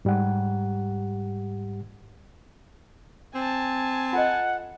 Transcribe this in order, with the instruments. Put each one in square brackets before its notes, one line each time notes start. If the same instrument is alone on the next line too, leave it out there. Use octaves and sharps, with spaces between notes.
[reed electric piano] G#2 G3 G4 F#5
[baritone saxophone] C4 [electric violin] G#5 A5
[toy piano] F4 A4 D#5 [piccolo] F#5